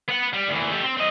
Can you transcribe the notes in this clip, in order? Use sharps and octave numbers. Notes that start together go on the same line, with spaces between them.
B3 F#5
G3
D2 E3
A3 G4
C4
C4 D#5